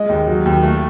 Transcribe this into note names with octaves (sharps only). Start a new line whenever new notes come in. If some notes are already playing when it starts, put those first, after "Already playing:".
Already playing: G#3 D#5
D#2
F#3
D#2
A3